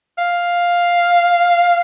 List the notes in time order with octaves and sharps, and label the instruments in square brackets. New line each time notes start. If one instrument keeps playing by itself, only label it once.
[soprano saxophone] F5